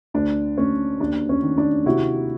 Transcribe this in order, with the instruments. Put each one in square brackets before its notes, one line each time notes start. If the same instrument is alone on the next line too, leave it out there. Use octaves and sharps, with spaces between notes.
[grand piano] D2 D4
D2 C#4
D#2 D4
C#4
D#3
D4
C3 E4 F#4